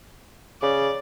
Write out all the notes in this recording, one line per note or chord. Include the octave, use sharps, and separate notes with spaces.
C#3 D5